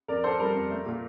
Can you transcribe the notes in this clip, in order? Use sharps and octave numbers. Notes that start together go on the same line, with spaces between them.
F2 A#4 D5
D4 A4 C5
G3 A#4
F2
A3
A#2